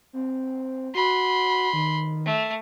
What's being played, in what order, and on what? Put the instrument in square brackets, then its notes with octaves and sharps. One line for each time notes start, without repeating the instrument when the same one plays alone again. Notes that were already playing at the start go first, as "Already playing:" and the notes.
[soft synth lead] C4
[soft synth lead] F#4 [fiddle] B5 C6
[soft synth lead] D#3
[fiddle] A3